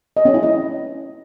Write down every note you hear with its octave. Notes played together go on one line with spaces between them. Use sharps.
D#5
C#4
E4
D#5